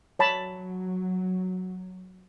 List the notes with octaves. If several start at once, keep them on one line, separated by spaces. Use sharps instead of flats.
F#3 C#5 A5 B5